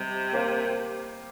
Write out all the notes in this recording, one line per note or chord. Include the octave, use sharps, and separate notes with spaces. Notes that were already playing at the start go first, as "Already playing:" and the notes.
Already playing: C3 G3 D#5
A#3 G4 C5 F5